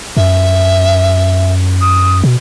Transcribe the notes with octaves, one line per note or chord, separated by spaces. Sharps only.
F#2 E5
D#6
B2